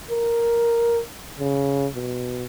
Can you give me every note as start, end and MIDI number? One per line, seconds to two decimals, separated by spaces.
0.11 1.01 70
1.39 1.87 49
1.95 2.46 47